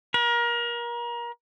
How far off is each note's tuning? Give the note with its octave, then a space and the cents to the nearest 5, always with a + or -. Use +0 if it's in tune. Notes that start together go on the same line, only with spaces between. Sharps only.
A#4 +30